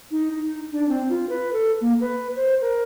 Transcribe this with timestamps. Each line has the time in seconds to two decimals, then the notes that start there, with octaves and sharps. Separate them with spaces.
0.11 D#4
0.39 D#4
0.72 D4
0.88 C4
1.09 F4
1.29 B4
1.53 A4
1.81 A#3
2.01 B4
2.36 C5
2.61 A#4